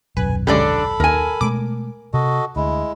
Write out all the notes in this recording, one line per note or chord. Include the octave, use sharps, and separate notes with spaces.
D#1 B1 F#2 B4 G#5
D3 G#3 C#4 D4 G4 A4 D5 B5
D#2 A#4 G#5
B2 G#3 A3 D6
C3 F#4 A4 D#5
D2 G#3 E4